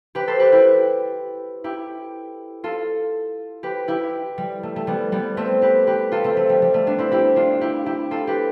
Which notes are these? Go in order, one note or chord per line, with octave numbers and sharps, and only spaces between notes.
G4 B4
A4 C5
G4 B4
E4 G4
E4 G4
F4 A4
G4 B4
E4 G4
G3
A3
A3
G3 B3
G3 B3
A3 C4
G4 B4
G4 B4
F4 A4
A3 C4
A3
G3
G3
A3
B3 D4
C4 E4
E4 G4
D4 F4
E4 G4
E4 G4
F4 A4
G4 B4